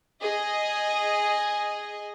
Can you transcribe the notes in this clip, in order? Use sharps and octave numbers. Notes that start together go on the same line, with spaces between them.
G#4 D#5